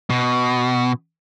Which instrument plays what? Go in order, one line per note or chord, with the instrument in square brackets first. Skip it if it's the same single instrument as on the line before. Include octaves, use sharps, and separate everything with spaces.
[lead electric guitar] B2